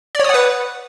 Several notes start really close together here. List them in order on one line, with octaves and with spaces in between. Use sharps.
D5 C#5 D#6 F#5 B4